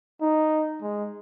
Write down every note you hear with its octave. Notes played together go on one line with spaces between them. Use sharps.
D#4
G#3